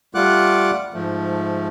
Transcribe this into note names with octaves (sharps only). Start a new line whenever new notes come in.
G3 A3 F4 F#5 D6 F#6
G#2 F3 A3